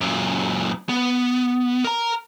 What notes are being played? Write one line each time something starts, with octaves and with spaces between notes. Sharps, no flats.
F#2 A#2
B3
A#4 A#5